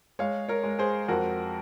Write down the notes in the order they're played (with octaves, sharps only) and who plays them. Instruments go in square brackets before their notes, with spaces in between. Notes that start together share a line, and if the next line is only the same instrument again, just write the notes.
[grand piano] G#3 C#5 F5
A#4 C#5
G#3
G#4 C5
F2 F#4 A#4